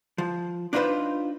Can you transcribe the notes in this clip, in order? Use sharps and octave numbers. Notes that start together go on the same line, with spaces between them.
F3
D4 D#4 F4 G#4 B4 C5